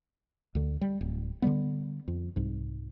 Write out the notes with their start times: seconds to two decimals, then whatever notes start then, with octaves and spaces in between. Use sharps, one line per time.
0.55 D2 D3
0.81 G3
1.01 D1
1.42 D3 E3 G3 B3
2.08 F2
2.36 C2 G#2